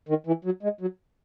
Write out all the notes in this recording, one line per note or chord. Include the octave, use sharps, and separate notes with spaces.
D#3
E3
F#3
G#3
F#3